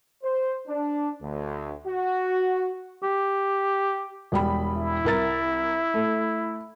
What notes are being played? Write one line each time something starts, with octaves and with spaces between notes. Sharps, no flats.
C5
D4
D2
F#4
G4
E1 G3 B5
E4
C2 A#4 A6
A3